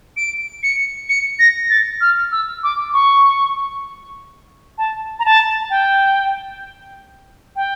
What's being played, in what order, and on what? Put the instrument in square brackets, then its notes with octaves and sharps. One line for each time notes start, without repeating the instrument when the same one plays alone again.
[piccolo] D7
C#7
C#7
A#6
A6
F6
E6
D6
C#6
A5
A#5
A5
G5
G5